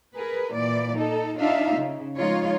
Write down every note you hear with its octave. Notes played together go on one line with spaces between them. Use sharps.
G#4 A#4 B4
A#2 E3 D5
D#4 A4
D4 D#4 F4 E5 F5
C#3
F3 G#3 D#4 F4 C#5